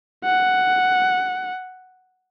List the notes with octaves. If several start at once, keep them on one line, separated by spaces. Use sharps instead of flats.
F#5